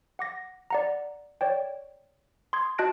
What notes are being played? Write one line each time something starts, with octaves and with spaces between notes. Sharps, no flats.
F#5 D6 A#6
D5 F#5 A#5
C#5 D5 G5
C6 D#6 G#6
F#4 D#5 A5 F#6 A#6 D7